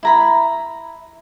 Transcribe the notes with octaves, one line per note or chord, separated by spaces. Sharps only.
E4 A#5 B5